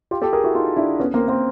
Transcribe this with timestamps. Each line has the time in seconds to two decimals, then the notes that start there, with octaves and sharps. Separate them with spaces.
0.11 F4 G4
0.22 G4 A4
0.33 G#4 A#4
0.44 E4 F#4
0.55 D#4 F4
0.77 D4 E4
1.00 B3 C#4
1.14 A#3 C4
1.28 A#3 C4